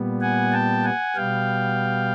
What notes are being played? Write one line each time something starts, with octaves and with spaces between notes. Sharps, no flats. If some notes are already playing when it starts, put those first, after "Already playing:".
Already playing: A#2 G3 B3
F#5 G#5
G5 A5
F#5 G#5
B2 G3 B3 F5 G5